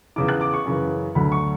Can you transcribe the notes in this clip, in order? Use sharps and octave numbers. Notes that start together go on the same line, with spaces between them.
E2 C#3 E3 D6
F#6
D6
C#6
F#2 C#3 E3
D2 D3 F#3 B5
C#6